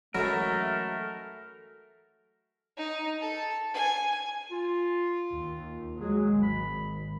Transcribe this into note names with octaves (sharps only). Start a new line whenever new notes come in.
E3 F#3 G#3 A3 C#4 A4 A#4 E5
D#4
A4
G#5
F4
D#2
F#3 G#3 G#4
G#1 B5